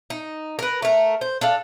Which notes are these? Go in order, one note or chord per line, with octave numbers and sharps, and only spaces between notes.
D#4
A#4 B4
A3 A#4
C5
D4 A4 F5